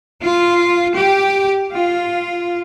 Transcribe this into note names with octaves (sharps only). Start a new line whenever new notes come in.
F4
G4
F4